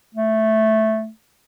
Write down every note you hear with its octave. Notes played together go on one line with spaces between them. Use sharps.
A3